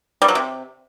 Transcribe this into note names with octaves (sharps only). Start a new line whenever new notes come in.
G3
F#3
C3